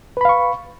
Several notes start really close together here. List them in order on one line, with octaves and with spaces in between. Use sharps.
B4 B5 F5 C#6